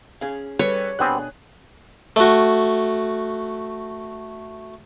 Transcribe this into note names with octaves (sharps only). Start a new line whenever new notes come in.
C#4 G#4 F5
G3 A4 B4 C#5
B2 G3 B3 C4 D4 G#4 D#6 F#6
A3 F#4